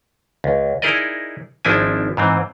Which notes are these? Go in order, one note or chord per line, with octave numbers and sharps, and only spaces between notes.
C#2
D#4 E4 G#4 A#4 D5 D#5
G#1 F3 C4 D4 E4 G#5
G#2 E3 C4